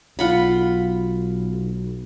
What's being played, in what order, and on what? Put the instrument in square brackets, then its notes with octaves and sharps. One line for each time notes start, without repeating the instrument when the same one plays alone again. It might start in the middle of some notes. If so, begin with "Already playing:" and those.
[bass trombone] B1 [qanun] F4 F#5 B5